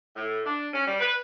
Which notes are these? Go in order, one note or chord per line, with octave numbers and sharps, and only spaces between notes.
A2
D4
C#4
G3
B4